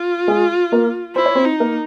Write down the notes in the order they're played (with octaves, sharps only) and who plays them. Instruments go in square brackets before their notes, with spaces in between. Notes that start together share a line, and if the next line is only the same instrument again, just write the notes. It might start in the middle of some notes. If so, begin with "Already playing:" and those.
Already playing: [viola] F4
[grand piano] G#3 G#4
A#3 A#4
[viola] E4 [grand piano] C5
[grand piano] C#5
C4 C5
[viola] D#4
[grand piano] A#3 A#4